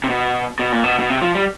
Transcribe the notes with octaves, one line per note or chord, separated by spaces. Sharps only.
C3
B2
B2
A#2
B2
B2
C3
F3
G3